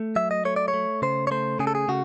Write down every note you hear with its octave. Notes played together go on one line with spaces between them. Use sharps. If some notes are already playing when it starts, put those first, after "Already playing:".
Already playing: A3
F#3 E5
D#5
A3 C#5
D5
C#5
A3
C#3 C5
C#5
A3 C5
C#3 G#4
A4
G#4
C#3 F#4